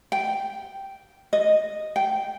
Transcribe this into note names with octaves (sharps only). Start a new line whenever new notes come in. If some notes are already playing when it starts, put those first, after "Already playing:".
G5
D#5
G5